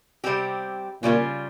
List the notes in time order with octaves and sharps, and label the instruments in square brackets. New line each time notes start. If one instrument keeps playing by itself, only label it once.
[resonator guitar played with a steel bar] C3 G3 C4 G4
[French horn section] A#2 [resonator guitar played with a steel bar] C#3 G3 C#4 F4